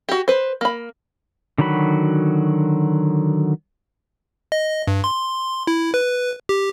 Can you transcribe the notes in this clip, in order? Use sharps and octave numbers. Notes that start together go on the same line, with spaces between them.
F#4 G4
B4 C5
A#3 B5
D3 D#3 F#3 F#4 B5
D#5
G2
C6
E4
B4
G4